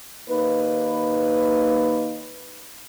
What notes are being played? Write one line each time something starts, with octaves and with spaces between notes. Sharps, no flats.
D#2 A#3 D#4 B4